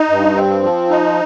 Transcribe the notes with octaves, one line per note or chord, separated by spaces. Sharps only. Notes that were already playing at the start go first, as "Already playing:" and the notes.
Already playing: D#4
G2
C4
F3
D#4